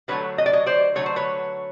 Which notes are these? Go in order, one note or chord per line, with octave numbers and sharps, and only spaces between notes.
D3 F#3 A3 B4 C#5
D#5
D5
C#5 D#5
C5 D5
D3 F#3 A3 C#5
C5
B4 C#5